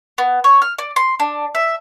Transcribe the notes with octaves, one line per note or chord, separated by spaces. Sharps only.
B3
C#5
F6
D5
C6
D4
E5